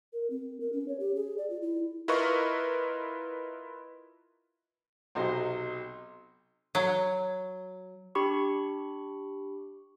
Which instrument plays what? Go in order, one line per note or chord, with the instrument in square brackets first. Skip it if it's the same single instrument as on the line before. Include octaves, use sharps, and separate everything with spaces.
[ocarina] A#4
C4
A#4
C#4
C#5
G4
G#4
D5
F4
E4
[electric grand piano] E4 F4 A#4 B4 D#5 C#6
[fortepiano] B1 C3 F#3 C5 D#5 C6
[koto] F#3
[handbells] D4 G4 B5 C#6